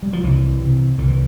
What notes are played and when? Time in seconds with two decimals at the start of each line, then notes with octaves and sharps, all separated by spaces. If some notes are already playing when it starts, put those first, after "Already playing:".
0.03 G3
0.13 F3
0.23 C2 E3
0.61 C3
0.98 C2 D3
1.08 E3